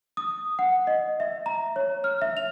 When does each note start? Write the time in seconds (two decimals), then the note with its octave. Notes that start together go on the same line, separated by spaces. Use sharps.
0.17 D#6
0.59 F#5
0.87 D#5
1.20 E5
1.46 A#5
1.76 C#5
2.04 F6
2.22 E5
2.37 F7